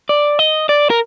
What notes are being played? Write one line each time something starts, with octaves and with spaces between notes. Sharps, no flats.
D5
D#5
D5
A#4